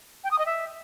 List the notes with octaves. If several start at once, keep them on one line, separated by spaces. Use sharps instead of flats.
G5
D#6
D#5
E5